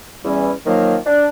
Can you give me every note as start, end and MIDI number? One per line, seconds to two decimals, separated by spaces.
0.24 0.51 40
0.24 0.51 52
0.24 0.51 55
0.24 0.51 61
0.65 0.96 51
0.65 0.96 53
0.65 0.96 54
0.65 0.96 58
1.05 1.26 62